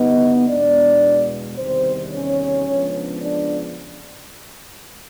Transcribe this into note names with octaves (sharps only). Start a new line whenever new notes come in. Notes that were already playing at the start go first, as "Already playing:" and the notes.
Already playing: G2 D3 G3 B3 D#4 D#5
E2 B2 G#3 B3 D4 D5
E2 C3 D#3 G3 C4 C5
C#4 C#5
C#3 F3 G#3 B3 D4
D4 D5